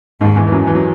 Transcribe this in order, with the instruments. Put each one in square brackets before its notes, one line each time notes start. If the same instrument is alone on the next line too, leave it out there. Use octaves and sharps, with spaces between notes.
[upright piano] D#2 D#3 [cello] G#2
[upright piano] E2 E3
E3
F#2 F#3
E3
F#3